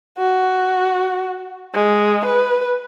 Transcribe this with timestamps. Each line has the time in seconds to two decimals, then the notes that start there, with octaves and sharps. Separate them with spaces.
0.18 F#4
1.74 G#3
2.25 B4